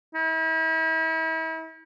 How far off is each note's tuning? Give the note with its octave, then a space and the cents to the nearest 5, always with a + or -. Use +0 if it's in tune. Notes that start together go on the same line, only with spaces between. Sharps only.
E4 -40